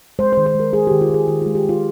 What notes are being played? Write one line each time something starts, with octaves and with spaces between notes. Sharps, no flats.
G#3 C5
C5
D#3
C5
G#3 A#4
G#3 G#4
D#3 G4
F4
D#3 G#4
D#3 F4
G#3 F4
G4
G#3 F4